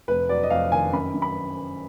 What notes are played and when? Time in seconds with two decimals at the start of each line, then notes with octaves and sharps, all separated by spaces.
0.08 F1 B4
0.29 F#3 D5
0.43 D#5
0.50 F2 F5
0.72 D#3 G#5
0.93 F#2 B5
1.14 F#2
1.22 B5